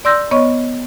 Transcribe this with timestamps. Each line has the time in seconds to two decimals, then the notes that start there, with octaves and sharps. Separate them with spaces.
0.05 D5 C6 E6 G6 A#6
0.31 B3 C#5 D#5 C#6